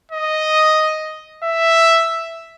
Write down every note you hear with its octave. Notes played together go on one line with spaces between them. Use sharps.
D#5
E5